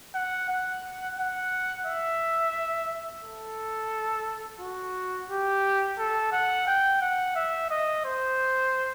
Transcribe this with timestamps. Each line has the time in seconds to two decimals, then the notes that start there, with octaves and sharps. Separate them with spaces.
0.15 F#5
0.49 F#5
1.18 F#5
1.86 E5
3.24 A4
4.60 F#4
5.30 G4
5.99 A4
6.32 F#5
6.67 G5
7.01 F#5
7.36 E5
7.70 D#5
8.05 C5